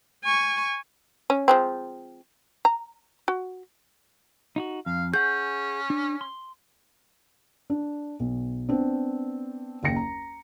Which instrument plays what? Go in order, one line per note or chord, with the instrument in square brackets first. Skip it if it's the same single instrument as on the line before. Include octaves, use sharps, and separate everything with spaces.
[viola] G#5 C#6
[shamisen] C#4
F3 G#3 C4
A#5
F#4
[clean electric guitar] D#4 F4 F#4
[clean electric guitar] F2 [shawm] F5
[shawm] C#4 [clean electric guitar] G#4 F#5 [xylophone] G6
[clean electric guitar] D4
C6
[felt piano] D4
B1
B3 C4 D4
F#1 D#2 G5 A#6 C#7
A#5